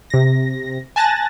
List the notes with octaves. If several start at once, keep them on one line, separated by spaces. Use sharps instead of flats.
C3 A#6
G#5 A5 F#6 A6 A#6